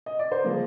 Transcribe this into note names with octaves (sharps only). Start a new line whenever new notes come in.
D#5
D5
C5
F3 G#3 A#3 A#4